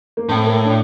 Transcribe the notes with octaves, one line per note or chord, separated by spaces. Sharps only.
A#3
A2 C4
A#3
D4